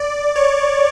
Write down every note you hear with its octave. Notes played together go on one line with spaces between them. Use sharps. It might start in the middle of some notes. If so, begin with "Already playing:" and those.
Already playing: D5
C#5